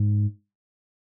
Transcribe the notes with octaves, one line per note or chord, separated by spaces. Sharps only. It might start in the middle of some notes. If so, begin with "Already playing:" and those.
Already playing: G#2